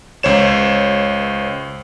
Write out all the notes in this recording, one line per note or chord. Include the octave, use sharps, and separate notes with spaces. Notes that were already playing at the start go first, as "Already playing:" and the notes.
C#2 C5 C#5 E7